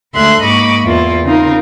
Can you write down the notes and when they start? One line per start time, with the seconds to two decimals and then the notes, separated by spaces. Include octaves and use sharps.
0.14 D2 G#3 A4 E5 C6 F#6
0.42 G#2 A#3 D#5 B5 C#6 D6
0.85 E2 A#3 E4 F4
1.24 C#3 C4 D#4 F4 A#4